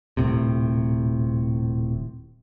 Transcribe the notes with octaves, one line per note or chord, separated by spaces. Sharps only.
D#1 A#1 A2 C3